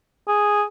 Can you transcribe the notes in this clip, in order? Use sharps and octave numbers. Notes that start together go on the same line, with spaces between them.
G#4